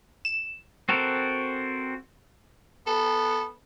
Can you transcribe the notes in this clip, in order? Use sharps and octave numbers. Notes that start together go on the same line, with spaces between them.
E7
C4 F#4 A4 A#4
B3 A4